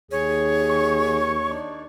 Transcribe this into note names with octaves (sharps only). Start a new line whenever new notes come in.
D#2 G#4 C#5
C#6
D4 D#4 D5